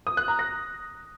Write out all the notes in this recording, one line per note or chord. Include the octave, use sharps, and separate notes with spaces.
D#6
F#6
A#5
A#6